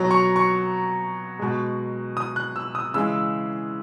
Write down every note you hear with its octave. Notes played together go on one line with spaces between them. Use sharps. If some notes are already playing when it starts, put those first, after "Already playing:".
Already playing: B2 F#3 A#5
C#6
C#6
B2 G#3
D#6
F#6
E6
D#6
C#3 E3 G#3 E6